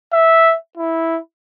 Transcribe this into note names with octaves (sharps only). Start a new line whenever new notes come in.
E5
E4